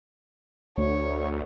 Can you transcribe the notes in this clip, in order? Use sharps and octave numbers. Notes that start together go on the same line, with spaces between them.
D2 C#5